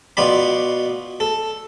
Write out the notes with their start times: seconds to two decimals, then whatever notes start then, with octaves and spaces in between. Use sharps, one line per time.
0.17 B2 F4 D5 B5
1.20 A4